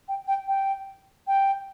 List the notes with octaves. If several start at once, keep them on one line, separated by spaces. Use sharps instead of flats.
G5
G5
G5
G5